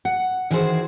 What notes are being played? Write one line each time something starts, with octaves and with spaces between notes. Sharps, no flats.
F#5
D#3 E3 F#4 G#4 B4 C5